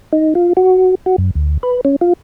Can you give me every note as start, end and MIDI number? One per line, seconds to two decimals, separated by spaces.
0.13 0.34 63
0.35 0.53 65
0.57 0.95 66
1.06 1.16 66
1.18 1.31 42
1.35 1.57 38
1.63 1.81 71
1.85 1.96 61
2.01 2.13 65